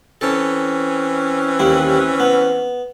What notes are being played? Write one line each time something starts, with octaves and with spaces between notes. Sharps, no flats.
E3 C4 C#4 A4
D#2 G3 E4
B3